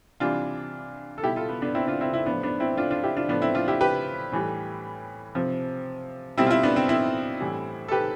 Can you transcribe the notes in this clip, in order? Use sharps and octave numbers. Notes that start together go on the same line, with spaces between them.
C3 E3 G3 D4 F4
A4
B2 G3 E4 G4
F4 A4
B3
B3 D4
C4 E4
D4 F4
C4 E4
C4 E4
A2 F3 B3 D4
B3 D4
C4 E4
D4 F4
D4 F4
E4 G4
D4 F4
A2 F3 B3 D4
C4 E4
D4 F4
E4 G4
G4 B4
A2 E3 G3
C3 F3
B2 G3 C4 E4
F4
C4 E4
B3 D4
C4
C4 E4
A2 E3 G3
A4
G4 B4